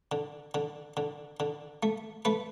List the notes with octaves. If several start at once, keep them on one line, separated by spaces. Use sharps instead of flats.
D3
D3
D3
D3
A3
A3 B4